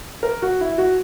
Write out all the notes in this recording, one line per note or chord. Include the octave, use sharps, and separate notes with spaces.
A#4
F#4
E4
F#4